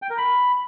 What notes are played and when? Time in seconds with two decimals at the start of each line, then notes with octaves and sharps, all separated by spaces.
0.02 G5
0.10 A#4
0.18 B5